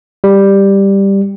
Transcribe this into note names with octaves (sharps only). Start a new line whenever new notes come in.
G3